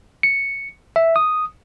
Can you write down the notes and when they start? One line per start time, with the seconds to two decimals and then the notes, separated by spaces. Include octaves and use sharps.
0.23 C#7
0.96 E5
1.16 D#6